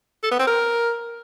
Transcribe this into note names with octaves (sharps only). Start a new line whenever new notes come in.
A4
B3
C4
A#4